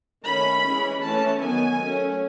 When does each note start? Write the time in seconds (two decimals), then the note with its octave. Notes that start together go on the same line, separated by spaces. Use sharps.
0.24 D#3 A3 C#4 B5
0.64 E3 G#3 C#4
1.02 E3 A3 C#4 A5
1.40 D#3 F#3 B3 G#5
1.79 F#3 A3 C#4